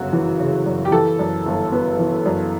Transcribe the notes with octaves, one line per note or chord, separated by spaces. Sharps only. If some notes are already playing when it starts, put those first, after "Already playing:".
Already playing: G1 F#2 C#3 F#4
E3
C#3
F#2
G4
E3 A4
F#2
G1
B3
E3
F#2